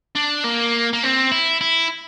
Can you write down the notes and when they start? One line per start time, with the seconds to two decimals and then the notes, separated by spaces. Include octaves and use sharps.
0.16 D4
0.44 A#3
0.93 A#3
1.03 C4
1.32 E4
1.61 E4